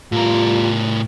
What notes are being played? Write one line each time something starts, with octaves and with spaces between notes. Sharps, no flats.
A2 G3 F4 A#4